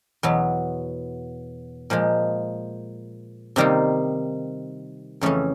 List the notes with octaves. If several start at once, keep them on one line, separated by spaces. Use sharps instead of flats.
E2 B2 F#3 B3
A#2 F3 G#3
C3 D#3 G3 A#3 D#4
F2 C#3 E3 A3 C#4